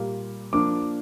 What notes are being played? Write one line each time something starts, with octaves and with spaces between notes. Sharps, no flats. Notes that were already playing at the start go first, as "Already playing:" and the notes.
Already playing: A#2 G3 A#3
F3 A#3 D4 D6